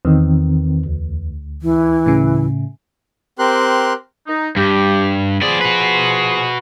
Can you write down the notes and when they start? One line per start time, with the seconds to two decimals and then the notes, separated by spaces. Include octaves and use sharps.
0.05 E2 D#3 C4
0.86 D2
1.62 E3
2.06 A2 C#3
3.39 C4 G4 A#4 C6 F#6
4.27 D#4
4.57 G2 G4
5.42 F3 B3 G#4 D5 C6
5.61 F#4 B4